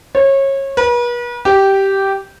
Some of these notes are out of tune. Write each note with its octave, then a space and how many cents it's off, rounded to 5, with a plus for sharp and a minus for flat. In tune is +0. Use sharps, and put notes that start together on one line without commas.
C#5 -25
B4 -40
G4 -10